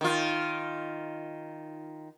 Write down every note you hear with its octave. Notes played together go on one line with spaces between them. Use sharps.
D#3 F4